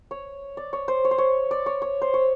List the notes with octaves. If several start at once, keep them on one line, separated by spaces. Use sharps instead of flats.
C#5
D5
C#5
C5
C#5
C5
C#5
D5
C#5
C#5
C5
C#5